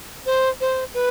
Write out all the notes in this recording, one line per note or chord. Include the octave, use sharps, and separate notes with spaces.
C5
C5
B4